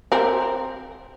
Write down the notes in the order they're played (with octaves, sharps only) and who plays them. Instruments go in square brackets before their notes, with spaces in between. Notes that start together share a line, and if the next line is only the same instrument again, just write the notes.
[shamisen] C4 A#4